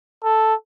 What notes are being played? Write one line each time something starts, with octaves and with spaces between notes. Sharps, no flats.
A4